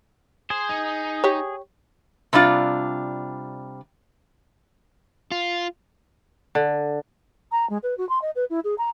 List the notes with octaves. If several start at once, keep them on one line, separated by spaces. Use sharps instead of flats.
G#4 C5
D#4
G4 C#5
C3 G3 D4 F4
F4
D3
A#5
G#3
B4
F#4
C6
D#5
B4
E4
G#4
A#5